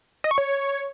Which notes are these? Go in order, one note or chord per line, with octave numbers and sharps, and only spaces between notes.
D#5
C#6
C#5